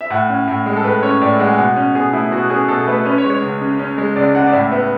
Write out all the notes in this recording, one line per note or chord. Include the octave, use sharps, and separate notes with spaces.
E5
A2 F#5
C#4
A2
G#3
A4
A2 B4
C#4 C#5
A2 D5
G#3 F#5
G#5
B2 F#5
C#4
B2 G#4
A3 E4
B2 F#4
C#4 G#4
B2 A4
A3 B4
C#4 B4
C#5
G#3
C#5
C#2
C#3
C#4
G#3
C#2 D5
C#3 F#5
D5
A2 E5
B3 E5